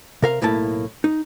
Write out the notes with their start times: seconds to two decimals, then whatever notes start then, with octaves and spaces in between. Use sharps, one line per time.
0.22 C3 A#4 F5
0.42 B1 A2 A#3 E4 A5
1.04 D#4